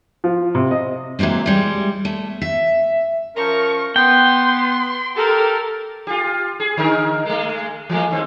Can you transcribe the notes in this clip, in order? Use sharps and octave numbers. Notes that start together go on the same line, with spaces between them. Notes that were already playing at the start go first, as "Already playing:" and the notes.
F3
C3
D#5
E3 F#3 G#3 A#3 C4
G3 G#3
A3
E5
F3 C#4 A#4 C#6
B3 G5 C6
G4 A4 A#4
F4 G4
G#4
D3 D#4 A#4
G#3 A3
E3 G#3 A3
D#2 G#3 C4